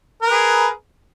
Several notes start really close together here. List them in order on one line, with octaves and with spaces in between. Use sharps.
A#4 B4 G#4